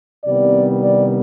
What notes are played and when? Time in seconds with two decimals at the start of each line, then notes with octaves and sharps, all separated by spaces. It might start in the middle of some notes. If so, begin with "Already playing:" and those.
0.25 C2 C3 D#3 G3 B3 D5
0.84 D5